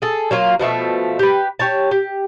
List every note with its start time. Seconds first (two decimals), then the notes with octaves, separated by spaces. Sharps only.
0.02 G#4 A4
0.31 F#3 A#3 F4
0.59 B2 F3 A3 E5
1.19 G4 B4
1.59 G4 C#5 A5
1.91 G4